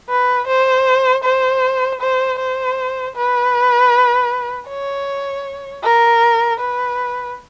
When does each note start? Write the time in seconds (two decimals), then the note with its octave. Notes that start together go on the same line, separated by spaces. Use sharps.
0.10 B4
0.48 C5
1.24 C5
2.01 C5
2.39 C5
3.15 B4
4.68 C#5
5.84 A#4
6.60 B4